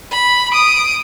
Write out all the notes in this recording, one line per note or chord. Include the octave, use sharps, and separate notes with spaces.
B5
D#6 D7